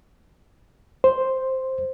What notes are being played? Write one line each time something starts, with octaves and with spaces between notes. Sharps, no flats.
C5